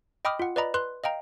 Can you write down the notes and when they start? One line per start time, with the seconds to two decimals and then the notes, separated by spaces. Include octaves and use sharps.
0.25 D#5 G5 B5 D6 D#6 F6
0.39 F4 F#5
0.56 B4 D5 D#5 A#5 B5
0.74 B4 C6 F#6
1.04 D#5 F5 G5 A#5